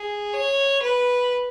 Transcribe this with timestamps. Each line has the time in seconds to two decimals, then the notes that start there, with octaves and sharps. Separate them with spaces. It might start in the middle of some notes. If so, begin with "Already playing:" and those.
Already playing: G#4
0.34 C#5
0.82 B4